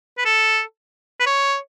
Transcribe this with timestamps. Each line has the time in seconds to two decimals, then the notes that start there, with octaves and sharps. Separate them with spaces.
0.18 B4
0.25 A4
1.20 B4
1.26 C#5